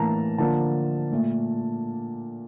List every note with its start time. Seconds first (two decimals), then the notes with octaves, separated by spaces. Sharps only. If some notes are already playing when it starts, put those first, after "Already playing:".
Already playing: A2 E3 A#3 A5 A#5
0.38 D3 F3 A#3 A5
1.12 A#2 A3